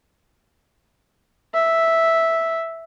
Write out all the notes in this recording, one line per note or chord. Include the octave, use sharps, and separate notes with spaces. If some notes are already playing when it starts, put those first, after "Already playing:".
E5